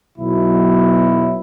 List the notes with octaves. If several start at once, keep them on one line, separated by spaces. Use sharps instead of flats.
B1 B2 F#3 E4